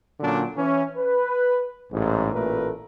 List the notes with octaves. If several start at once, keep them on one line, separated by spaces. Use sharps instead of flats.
A#2 D3 F#3 C#4 D4
E3 C#4
B4
A1 G#2
A1 A#2 A3 A#4 B4